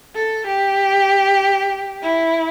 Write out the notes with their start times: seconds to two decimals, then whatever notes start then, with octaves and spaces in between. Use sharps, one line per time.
0.15 A4
0.47 G4
2.03 E4